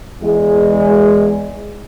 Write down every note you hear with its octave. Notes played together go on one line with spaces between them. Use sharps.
E2 G#3